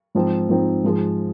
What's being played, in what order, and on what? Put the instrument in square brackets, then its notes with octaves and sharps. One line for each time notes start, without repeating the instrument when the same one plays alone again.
[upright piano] G#2 F3 C4 D#4
G#2 F3 C4 D#4
G#2 F3 G#3